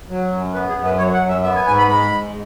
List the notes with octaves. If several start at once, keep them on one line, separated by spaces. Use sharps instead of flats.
F#3
F#2
B3 B4
G#4
F#2
B4
F#3 C#5
F#5
F#2
E5
B3 E5
G#5
G#2 G#5
B5
G#3 B5
G#2